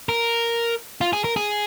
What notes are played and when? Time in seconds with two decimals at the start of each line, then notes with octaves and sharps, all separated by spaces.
0.09 A#4
1.01 F4
1.13 G#4
1.24 A#4
1.36 G#4